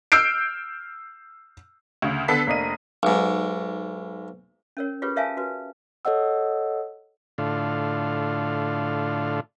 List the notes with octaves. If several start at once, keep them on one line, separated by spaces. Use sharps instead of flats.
E6 F6 G6 C7 D7
D2 C#3
D3 B3 A4 B4 B6 C7
F1 A#3 D4 D#5 D#7
B1 G#2
C#4 A#4 C#5
F4 G4 G#4 B4 C#5
A#4 C#5 E5 F5 G#5 A5
F#4 B4
A4 C#5 D#5 F#5 E6
A2 D3 F4